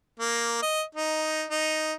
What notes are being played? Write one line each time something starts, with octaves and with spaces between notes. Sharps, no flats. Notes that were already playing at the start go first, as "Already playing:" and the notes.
A#3
D#5
D#4
D#4